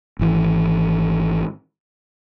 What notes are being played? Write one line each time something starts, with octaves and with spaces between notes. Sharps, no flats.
G#1 E3